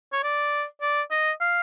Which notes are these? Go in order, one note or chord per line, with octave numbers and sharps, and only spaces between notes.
C#5
D5
D5
D#5
F5